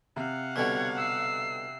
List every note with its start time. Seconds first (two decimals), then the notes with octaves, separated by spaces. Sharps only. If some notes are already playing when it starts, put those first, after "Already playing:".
0.16 C3 F5 F#5
0.56 B2 D3 G3 C#5 G#6
0.98 E6 C7